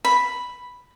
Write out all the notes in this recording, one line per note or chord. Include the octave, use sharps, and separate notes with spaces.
B5